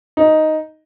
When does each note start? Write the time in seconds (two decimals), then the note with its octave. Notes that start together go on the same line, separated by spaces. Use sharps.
0.17 D#4